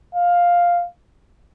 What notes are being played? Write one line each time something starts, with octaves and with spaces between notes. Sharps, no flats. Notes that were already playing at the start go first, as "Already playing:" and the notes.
F5